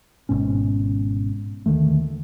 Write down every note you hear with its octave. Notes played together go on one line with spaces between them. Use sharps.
G#1 G#2 B2 C#4
D#2 D3 D#3 A3